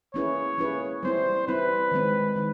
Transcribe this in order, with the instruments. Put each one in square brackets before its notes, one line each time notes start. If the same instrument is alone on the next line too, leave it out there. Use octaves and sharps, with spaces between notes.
[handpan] A#3 C#4 E4 G#4 B4 [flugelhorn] C#5
[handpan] A#3 C#4 E4 G#4 B4
[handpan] G3 C4 E4 [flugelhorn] C5
[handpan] G3 C4 E4 [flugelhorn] B4
[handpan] D#3 G#3 C4
D#3 G#3